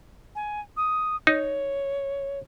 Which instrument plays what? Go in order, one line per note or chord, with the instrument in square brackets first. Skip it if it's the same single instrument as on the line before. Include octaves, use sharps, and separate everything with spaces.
[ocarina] G#5
D#6
[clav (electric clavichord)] D#4 [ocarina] C#5